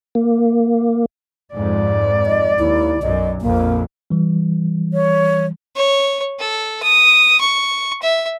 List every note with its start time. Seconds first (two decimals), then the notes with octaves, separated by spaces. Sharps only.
0.15 A#3
1.54 F2 G#2 D5
2.26 D#5
2.59 D#2 E4
3.02 B1 F#2 D#5
3.41 A#1 F2 A#3
4.10 E3 G3
4.93 C#5
5.76 C#5
6.40 A4
6.83 D#6
7.41 C#6
8.02 E5